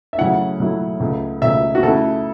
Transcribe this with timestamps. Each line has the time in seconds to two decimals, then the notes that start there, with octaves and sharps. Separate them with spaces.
0.13 E5
0.18 C#3 F#3 A3 C#4 E4 F#5
0.60 C#3 F#3 A3 C#4 E4
1.00 C#2 C#3 A3
1.41 C#2 C#3 A3 E5
1.75 F#4
1.83 C#3 A3 E4 A4